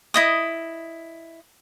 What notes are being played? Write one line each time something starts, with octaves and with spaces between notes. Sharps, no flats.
E4 D#5 D#6